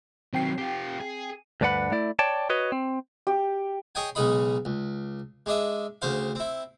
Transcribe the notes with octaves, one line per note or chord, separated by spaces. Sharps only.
D#3 F#3 C4 G5 C7
F4 G4
G#4
D2 G2 D4 B4 F#5 B5
A3 E4 D5
C#5 D5 G5 A5
F#4 B4 C#5 D#5
C4
G4
G#4 C#5 D#5 G5 G#5
B1 C#3 G#3 D#4 D#5 B5
C#2
G#3 D4 D#5 E5
D2 C#3 C5 F5
C4 E4